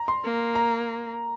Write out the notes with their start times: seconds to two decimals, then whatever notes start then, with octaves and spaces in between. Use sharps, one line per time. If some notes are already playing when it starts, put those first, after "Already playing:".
Already playing: A#5
0.08 C6
0.24 A#3
0.55 A#5